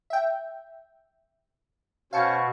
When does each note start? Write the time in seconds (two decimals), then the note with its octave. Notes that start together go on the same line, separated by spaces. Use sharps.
0.10 E5 G5
2.13 B2 C#4 C5 C#5 F5 A5 C#7